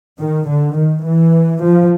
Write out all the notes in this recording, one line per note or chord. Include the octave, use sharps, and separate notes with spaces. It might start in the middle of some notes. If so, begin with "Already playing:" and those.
D#3
D3
D#3
E3
F3